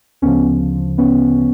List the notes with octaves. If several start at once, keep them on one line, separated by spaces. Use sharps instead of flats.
D2 C#3 F3 B3 C#4
B3 C#4